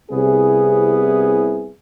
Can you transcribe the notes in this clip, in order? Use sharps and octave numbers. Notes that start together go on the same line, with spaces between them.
C2 C3 B3 E4 G#4